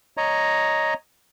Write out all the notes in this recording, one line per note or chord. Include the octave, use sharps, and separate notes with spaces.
C#5 D#5 A#5